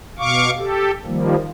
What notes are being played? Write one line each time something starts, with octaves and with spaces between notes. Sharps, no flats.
B2 F5 C#6 D6
G4 A4
D#3 F3 G3 A#3